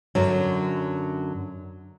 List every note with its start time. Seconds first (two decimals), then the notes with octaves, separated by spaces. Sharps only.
0.15 F#2 D3 F#3